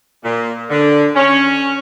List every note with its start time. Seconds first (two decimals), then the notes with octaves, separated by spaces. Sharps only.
0.24 A#2
0.70 D3
1.16 C#4